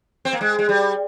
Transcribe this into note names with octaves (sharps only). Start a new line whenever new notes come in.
C4
A#3
G#3
G#3
G3